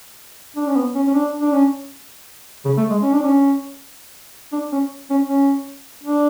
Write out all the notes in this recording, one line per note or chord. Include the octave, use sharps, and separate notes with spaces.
D4
C#4
B3
C#4
C#4
D4
D4
C#4
C#3
A3
G#3
C#4
D4
C#4
D4
C#4
C#4
C#4
D4